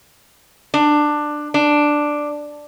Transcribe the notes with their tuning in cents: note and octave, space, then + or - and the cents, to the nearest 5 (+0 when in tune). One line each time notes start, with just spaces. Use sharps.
D4 +15
D4 +5